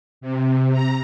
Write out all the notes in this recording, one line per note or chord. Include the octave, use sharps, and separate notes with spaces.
C3
A#5